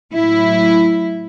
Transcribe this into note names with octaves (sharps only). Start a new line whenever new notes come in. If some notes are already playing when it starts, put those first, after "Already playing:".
A2 F#3 E4